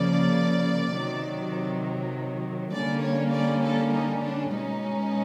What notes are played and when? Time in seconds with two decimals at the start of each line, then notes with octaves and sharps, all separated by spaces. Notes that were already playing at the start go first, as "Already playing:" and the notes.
Already playing: C#3 F3 A#3 D5
0.94 C3 D#3 F#3
2.73 D3 G3 A#3 C#4 D5
3.02 C#5
3.32 D5
3.63 A4
3.92 D#4
4.23 D4
4.52 B2 G#3 C#4 D#4